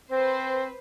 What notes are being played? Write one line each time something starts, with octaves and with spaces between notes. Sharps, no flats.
C4 B4 C5